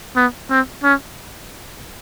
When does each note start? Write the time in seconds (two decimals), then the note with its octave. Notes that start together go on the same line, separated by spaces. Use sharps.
0.16 B3
0.50 C4
0.84 C#4